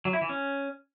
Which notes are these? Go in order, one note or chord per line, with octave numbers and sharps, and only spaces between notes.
F#3
E4
E3
C#4